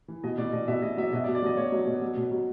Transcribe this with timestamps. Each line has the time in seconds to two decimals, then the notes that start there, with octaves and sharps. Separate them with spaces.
0.08 E3
0.23 B2 D#5
0.38 B2 D5
0.53 B2 D#5
0.68 B2 E5
0.82 B2 D#5
0.98 F#3 E5
1.13 B2 D#5
1.24 D5
1.27 B2
1.35 D5
1.42 F#3 D#5
1.57 B2 C#5
1.72 F#3
1.87 B2
2.01 F#3
2.17 B2
2.31 F#3